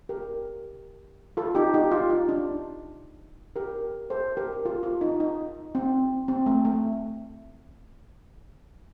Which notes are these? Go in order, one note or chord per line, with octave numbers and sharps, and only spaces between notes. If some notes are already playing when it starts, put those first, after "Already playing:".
G4 A#4
F4 A4
D#4 G4
D#4 G4
F4
D#4
D4
G4 A#4
A4 C5
G4 A#4
F4 A4
F4
D#4
D#4
C4
C4
A3
A3